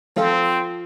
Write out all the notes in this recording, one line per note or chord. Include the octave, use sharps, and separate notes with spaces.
F3 C4 F4 A4